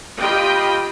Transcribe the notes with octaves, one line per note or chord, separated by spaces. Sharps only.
F4 G4 D#5 G5 B5